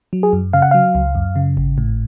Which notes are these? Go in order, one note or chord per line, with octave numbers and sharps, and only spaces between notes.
F#3
G#4
F#2
C#3 F5
F#5
F#3 F5
C#2
F#2
C#3
G#1
A2